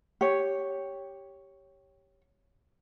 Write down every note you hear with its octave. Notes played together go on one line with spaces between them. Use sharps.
G4 C#5